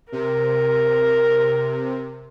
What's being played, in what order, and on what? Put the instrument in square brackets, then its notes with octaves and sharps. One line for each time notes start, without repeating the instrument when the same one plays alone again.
[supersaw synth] C3 [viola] A#4